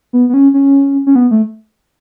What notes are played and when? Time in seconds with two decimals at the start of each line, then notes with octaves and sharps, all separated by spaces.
0.13 B3
0.29 B3
0.34 C#4
0.54 C#4
1.07 C#4
1.15 B3
1.31 A3